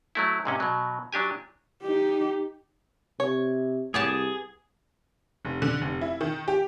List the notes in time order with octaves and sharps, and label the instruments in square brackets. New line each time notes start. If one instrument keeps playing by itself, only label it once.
[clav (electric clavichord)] F#3 A3 E4
G#2 C3 C#4
B2 F#3
F#3 D4 G4 G#5
[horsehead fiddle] D#4 G4
[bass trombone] C3 [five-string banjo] C#5
[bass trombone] C2 [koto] B3 G4 A5 [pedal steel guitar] G#4
[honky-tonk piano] F1
D3
F1
E4
D#3
G4